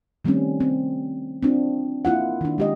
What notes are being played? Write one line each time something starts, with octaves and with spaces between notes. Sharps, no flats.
D#3 G3 A3 C4 C#4
C4
C4 D4 F4
A#3 E4 F4 F#5
D#3 D4
G#3 G4 D#5